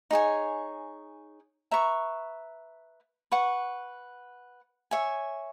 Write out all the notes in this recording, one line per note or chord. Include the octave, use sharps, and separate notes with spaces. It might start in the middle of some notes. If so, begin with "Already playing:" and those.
D#4 G#4 C#5 G#5
B4 E5 A#5 C#6
B4 F#5 C#6
C#5 E5 G#5